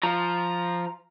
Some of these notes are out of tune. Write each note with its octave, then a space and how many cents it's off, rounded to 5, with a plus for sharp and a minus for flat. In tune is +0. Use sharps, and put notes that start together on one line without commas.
F3 +0 A#5 +0